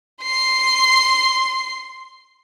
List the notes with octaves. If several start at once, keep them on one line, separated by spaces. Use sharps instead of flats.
C6 C7